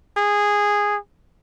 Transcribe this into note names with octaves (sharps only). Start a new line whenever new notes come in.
G#4